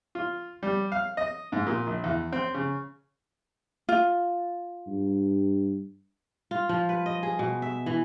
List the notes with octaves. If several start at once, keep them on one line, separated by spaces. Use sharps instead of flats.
F4
G3
F5
D#5
G#2
A#2
A#1
E2
C4
C#3
F4
G2
F4
F3
B4
D#5
G#4
B2
E5
E3